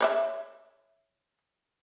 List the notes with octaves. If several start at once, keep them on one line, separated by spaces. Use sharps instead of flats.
C#5 D5 E5